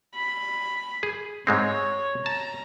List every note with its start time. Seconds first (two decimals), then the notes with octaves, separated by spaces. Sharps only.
0.15 B5
1.03 G#4
1.47 G#2 G#3 C4 C#5
2.26 A5 A#5